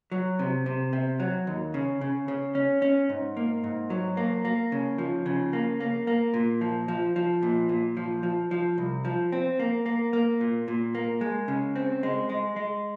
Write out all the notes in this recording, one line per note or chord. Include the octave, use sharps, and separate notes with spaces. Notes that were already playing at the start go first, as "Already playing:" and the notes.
F#3
C3
C3
C3
F#3
D#2
C#3
C#3
C#3
C#4
C#4
G#2
A#3
G#2
F#3
A#3
A#3
C#3
F3
C#3
A#3
A#3
A#3
A#2
F3
F3
F3
A#2
A#2
F3
F3
F3
C2
F3
C4
A#3
A#3
A#3
A#2
A#2
A#3
G#3
C#3
C4
G#3
G#3
G#3